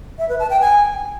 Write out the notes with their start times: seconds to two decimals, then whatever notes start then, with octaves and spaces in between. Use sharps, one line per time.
0.19 E5
0.29 B4
0.40 A5
0.50 G5
0.60 G#5